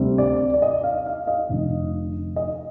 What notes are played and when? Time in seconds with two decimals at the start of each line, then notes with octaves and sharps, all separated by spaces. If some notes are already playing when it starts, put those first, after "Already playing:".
Already playing: D2 C3 G3 C4
0.18 D5
0.54 D5
0.62 D#5
0.84 F5
1.06 F5
1.27 D#5
1.49 F1 F2 D3
2.36 D#5